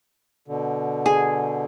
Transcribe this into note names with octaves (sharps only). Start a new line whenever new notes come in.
B2 D3
G#4